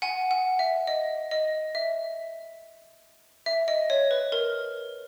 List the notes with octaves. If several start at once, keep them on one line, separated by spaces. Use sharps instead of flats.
F#5 G#5
F#5
E5
D#5
D#5
E5
E5
D#5
C#5
B4
A#4